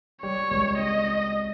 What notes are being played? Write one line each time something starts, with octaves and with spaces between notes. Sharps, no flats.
G3 C#5
C#2
C4 D#5